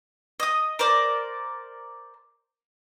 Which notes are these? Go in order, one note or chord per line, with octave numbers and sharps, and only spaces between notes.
D#5 D#6
A#4 C5 D5